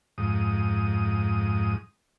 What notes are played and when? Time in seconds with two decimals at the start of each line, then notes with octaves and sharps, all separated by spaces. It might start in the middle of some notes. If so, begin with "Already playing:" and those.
0.18 F2 G#2 D#6